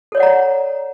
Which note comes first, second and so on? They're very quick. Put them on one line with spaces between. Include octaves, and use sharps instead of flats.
A4 C#5 D5 F#5 A#5